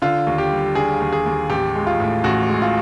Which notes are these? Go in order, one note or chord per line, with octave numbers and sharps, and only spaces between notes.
D3 F4
D#2
G4
G3
D3 G#4
D#2
G#4
D#2
A1 G4
G#3
F4
A2
A1 F#4
G#3
F4